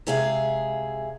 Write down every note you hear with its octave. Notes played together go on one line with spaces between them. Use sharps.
C3 G#3 G#4 E5 F5